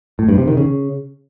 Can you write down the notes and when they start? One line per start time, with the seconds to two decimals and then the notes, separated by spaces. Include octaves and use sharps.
0.19 A2
0.28 G2
0.38 C3
0.48 D#3
0.57 C#3